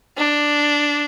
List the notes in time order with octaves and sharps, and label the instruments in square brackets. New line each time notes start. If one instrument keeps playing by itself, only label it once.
[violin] D4